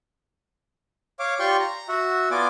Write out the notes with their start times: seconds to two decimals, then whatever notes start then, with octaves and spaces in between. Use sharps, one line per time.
1.19 C#5 F5 D6
1.39 F4 G4 D5 G5 C6 C#6
1.60 A#5
1.89 F#4 E5 F#5
2.31 B3 F4 D5 G#5 D6